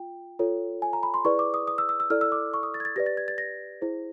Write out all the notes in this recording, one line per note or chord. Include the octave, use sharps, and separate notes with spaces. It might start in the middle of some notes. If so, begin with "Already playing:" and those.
Already playing: F4 G5
F4 A4 C#5
G#5
A#5
B5
C6
E4 G#4 B4 D5 C#6
D6
D#6
D#6
E6
E6
E6
E4 A4 D5 F6
E6
D6
C#6
D#6
A6
G#6
A6
G4 B4 D5 A#6
A6
G#6
A6
A#6
E4 G#4 C5